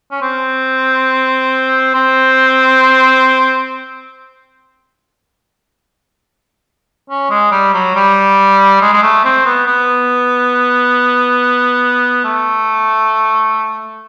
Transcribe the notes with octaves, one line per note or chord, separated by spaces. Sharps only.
C#4
C4
C4
C#4
G#3
G3
F#3
G3
G#3
G#3
A3
C4
B3
B3
A3